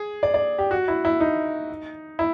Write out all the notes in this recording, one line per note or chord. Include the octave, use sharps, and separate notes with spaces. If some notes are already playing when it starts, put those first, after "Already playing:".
Already playing: G#4
D5
D5
G4
F#4
E4
E4
D#4
E4